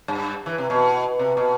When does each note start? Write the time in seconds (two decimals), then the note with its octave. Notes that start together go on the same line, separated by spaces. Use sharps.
0.08 G2
0.46 E3
0.58 C3
0.70 B2
1.19 C3
1.37 B2